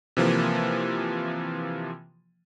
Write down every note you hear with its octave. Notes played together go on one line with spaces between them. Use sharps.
C3 E3 F3 A#3